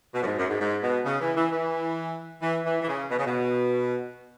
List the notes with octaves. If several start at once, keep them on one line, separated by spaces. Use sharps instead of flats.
B2
F#2
G#2
F#2
G#2
G#2
B2
C#3
E3
E3
E3
E3
E3
E3
C#3
B2
C#3
B2